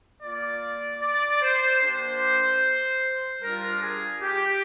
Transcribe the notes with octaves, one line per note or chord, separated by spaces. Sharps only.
A#3 F4 D5
D5
C5
A#3 D4 G4 C5
G3 D4 F4 A#4
G#4
G4